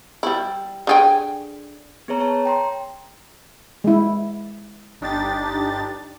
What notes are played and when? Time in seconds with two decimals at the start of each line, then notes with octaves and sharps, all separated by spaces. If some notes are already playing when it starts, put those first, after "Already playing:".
0.23 G3 E4
0.87 D3 G#4 G5
2.08 B3 G#4 B4 C#5 A#5
2.20 C#5 A5 A#5
2.46 G5 A#5 C6
3.84 G#3 E4
5.01 G1 D4 D#4 G4 A6